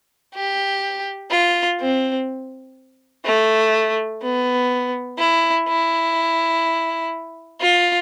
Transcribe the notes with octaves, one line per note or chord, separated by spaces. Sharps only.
G4
F4
C4
A3
B3
E4
E4
F4